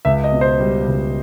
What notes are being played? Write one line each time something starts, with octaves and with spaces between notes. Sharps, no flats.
C#2 E5
D#5
B2
C5
G3
C#2